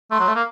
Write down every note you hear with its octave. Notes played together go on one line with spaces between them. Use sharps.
A3 C6
F#3
A3
A#3